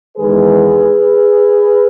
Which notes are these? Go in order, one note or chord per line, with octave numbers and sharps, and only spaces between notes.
E2 D#3 G#3 G#4 B4